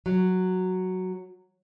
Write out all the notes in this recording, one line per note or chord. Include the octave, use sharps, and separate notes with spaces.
F#3